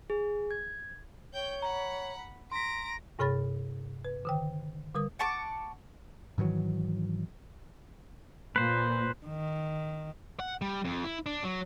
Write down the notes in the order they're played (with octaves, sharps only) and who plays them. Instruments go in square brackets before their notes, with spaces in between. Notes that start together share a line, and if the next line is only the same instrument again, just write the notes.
[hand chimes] G#4
G#6
[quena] C#5 [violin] G5 G6
[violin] F#5 B5 [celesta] A#5
[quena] A#5 [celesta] C6 B6 [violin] A#6 D7
[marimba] G2 C3 G#4 C#5 B5 A6
B4
D3 D#3 G5
D3 G3 A#4 D#6
[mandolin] F#5 A5 C#6 D6
[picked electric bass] G#2 D#3 E3 F#3
[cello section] A#2 [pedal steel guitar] B4 C5
[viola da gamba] D#3
[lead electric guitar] F#5
G3
F2
E4
D4
F#3